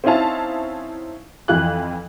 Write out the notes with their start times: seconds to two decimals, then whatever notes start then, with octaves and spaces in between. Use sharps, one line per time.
0.04 C4 C#4 D#4 E4 F5 A5
1.48 F2 E3 F4 F#6